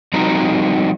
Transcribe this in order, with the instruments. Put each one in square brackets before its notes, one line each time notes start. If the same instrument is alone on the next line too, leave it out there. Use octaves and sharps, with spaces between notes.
[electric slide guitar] F3 G3 C4 D#4 F#4 A#5